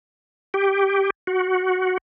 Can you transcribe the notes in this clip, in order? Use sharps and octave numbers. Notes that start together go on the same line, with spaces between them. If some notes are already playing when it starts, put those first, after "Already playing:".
G4
F#4